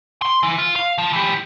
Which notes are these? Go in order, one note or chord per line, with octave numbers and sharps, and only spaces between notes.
C6
E3
F4
F5
F3
E3 G4